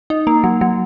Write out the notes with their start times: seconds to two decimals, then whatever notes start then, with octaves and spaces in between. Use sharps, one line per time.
0.10 D#4
0.27 A#3
0.44 F#3
0.61 F#3